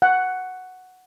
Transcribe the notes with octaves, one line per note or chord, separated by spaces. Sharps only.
F#5